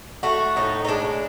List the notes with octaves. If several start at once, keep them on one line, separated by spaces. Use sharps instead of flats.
A3 F#4
A2 D#4
D#4
G#3 D4